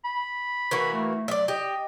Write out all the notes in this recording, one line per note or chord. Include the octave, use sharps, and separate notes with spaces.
B5
E3 A#3 F#4
A3
F#3 D5 E5
G4 D#5